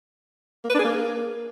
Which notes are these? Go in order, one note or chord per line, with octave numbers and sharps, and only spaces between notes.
A#3
B4
D4
G#4
A#3